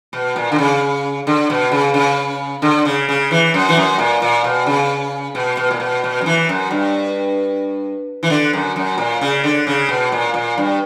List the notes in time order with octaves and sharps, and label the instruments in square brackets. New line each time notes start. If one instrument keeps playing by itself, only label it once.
[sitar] B2
A#2
D3
C#3
D3
B2
C#3
C#3
D3
C#3
C#3
E3
F#2
E3
F#2
A#2
A#2
B2
C#3
B2
B2
A#2
B2
B2
F#2
E3
F#2
G2
E3
D3
F#2
F#2
A#2
C#3
D3
C#3
B2
A#2
A#2
G2